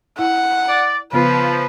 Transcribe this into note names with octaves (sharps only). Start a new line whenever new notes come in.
E4 F#5
D5
C#3 F3 B3 F4 B4